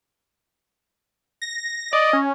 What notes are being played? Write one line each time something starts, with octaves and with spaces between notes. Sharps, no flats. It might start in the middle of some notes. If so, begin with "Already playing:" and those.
A#6
D5 D#5
C#4